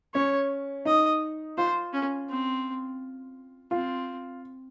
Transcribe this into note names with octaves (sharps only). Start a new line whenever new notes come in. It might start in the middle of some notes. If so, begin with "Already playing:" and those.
C#4 C#5
D#4 D#5
F4 C5
C#4
C4
C4 F4